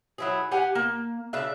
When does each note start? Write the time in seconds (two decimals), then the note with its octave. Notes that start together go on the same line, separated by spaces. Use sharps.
0.18 F#3 E4 G#4
0.51 G4 F#5 G#5
0.75 A#3
1.33 C#3 D4 E5